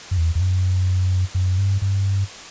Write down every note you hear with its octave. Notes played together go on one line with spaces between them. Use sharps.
F#2
E2
E2
F#2
F#2
G2
G2